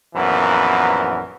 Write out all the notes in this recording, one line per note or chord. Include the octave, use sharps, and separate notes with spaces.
A#1 F#2 E3 B3 A#4